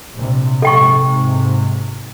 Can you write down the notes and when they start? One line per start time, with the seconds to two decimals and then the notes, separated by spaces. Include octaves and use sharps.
0.15 A#1 C3
0.62 G#2 C3 A4 G5 C#6